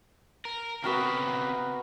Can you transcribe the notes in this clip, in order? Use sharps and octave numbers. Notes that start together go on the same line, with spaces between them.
A#4
C#3 B3 C4 F#4 A#4 E5